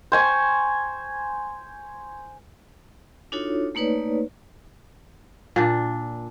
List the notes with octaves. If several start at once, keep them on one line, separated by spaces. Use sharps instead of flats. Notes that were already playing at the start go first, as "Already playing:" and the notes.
C5 G#5 C#6
D4 D#4 F4 F#4 A4 C#5
A3 A#3 D#4 B4 C#5 D5
A#2 D4